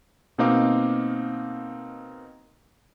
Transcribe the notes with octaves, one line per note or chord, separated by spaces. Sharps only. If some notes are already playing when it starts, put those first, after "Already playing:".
B2 A#3 C4 D#4 F5 D6